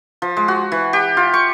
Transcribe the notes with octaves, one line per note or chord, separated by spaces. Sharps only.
F3
G#3
F#4
E3
G4
F4
C#6